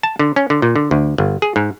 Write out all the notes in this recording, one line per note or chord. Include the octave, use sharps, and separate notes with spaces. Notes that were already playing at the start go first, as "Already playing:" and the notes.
A5
D3
C#4
D3
A#2
D3
D2
G1
G#4
G#2